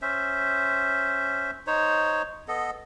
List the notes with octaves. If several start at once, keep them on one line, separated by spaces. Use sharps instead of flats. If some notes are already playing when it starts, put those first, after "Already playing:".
C#4 C5 E5
D#4 C5 C#5
B3 A4 D#5